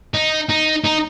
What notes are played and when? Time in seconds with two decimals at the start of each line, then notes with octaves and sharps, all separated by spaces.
0.14 D#4
0.49 D#4
0.84 D#4